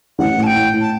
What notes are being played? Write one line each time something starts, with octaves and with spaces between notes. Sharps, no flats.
A1 F#5
A2
A5
G5
A2
A2
A5